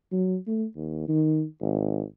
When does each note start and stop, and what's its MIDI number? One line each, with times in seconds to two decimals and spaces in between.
0.12 0.37 54
0.47 0.65 57
0.76 1.05 39
1.08 1.44 51
1.61 2.03 32